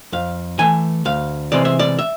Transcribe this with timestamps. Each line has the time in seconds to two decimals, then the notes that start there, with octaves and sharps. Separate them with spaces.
0.12 F2 F5
0.59 E3 A3 G#5
1.05 D2 F5
1.52 C3 E3 G#3 C4 D5
1.65 E5
1.79 D5
1.99 E5